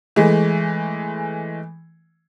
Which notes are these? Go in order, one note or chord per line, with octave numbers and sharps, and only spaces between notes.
E3 G#3 A3